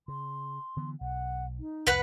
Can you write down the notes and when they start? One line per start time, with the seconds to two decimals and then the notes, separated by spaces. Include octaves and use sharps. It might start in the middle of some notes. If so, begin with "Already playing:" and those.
0.08 C#3 C6
0.77 D3 E3 B3
1.01 B1 F#5
1.59 D#4
1.87 C2 F2 B4 F#5 F#6